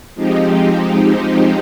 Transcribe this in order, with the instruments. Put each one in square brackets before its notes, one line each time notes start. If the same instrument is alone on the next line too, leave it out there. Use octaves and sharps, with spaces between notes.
[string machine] F3 G#3 C4 D#4 G4